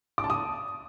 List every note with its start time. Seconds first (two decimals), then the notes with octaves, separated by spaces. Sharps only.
0.18 D6
0.24 A5
0.30 D#6